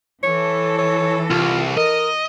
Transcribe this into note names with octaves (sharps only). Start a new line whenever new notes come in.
E3 A4 C#5
C#5
C2 F4
A#4 D#5